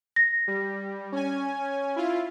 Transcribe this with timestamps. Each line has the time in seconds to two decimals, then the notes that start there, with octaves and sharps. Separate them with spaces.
0.16 A#6
0.48 G3
1.12 C#4 G#5
1.96 E4 F4